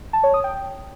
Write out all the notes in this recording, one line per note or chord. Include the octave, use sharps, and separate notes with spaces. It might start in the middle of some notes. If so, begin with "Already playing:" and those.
A5
C#5
D#6
G5